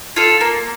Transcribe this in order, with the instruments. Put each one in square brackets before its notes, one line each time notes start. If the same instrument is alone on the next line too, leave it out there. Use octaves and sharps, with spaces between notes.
[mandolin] F4 A4
A#3